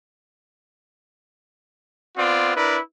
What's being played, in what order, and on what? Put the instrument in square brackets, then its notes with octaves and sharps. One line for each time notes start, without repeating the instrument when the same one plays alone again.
[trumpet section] B3 C4 F4 D5
D4 E4 A#4 B4